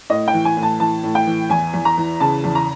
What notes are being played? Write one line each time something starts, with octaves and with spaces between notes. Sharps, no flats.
A2 D#5
G5
E3
G#5
A2
A5
E3 A5
A2
G5
E3
E2 G#5
E2
A#5
E3
C#3 A5
E2
A#5